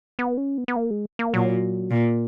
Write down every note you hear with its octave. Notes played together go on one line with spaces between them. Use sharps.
B3
C#4
B3
B3
A#3
G#3
A#3
A#2 F#3
A#2 A#3